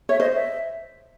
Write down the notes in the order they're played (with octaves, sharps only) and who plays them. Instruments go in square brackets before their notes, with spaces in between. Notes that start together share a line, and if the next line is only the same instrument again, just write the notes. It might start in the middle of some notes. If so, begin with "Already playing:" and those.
[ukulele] C#5 [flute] E5
[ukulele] C5 [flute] D#5
[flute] E5